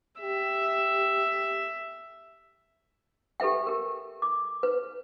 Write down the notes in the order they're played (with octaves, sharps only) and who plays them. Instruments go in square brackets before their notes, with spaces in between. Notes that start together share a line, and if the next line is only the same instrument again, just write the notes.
[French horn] G4 [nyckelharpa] E5
[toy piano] G4 A4 B4 E5 G5
G4 A#4
D6
B4